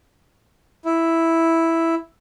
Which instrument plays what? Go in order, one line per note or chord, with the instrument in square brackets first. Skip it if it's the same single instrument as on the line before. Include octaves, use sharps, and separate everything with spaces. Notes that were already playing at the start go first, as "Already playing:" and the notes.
[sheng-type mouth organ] E4